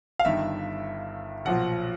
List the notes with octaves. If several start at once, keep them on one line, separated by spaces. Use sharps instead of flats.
F5
G1 G2 D#3 E5
B1 A#2 F3 F#5